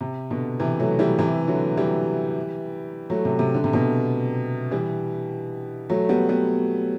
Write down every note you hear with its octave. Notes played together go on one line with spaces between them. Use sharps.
C3
B2 D3
C3 E3
F#3 A3
E3 G3
C3 E3
D3 F#3
E3 G3
F#3 A3
C3
C3
D3
C3
B2 D3
E3 G3
F#3 A3
G3 B3
G3 B3